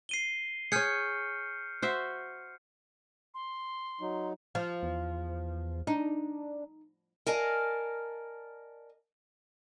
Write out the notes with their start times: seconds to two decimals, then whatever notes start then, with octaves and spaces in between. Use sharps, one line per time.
0.09 C7 D#7 G7
0.72 G#4 C#5 F6 G6 C#7
1.82 F#4 C5 E5
3.34 C6
4.01 F#3 D#4
4.55 F3
4.83 E2
5.87 D4 D#4
7.27 A#4 D5 D#5 F5 G#5 A5